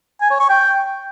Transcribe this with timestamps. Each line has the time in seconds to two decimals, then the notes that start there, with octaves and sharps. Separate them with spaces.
0.21 G#5
0.31 C#5
0.40 C#6
0.49 G5